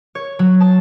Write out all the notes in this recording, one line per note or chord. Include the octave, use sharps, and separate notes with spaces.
C#5
F#3
A5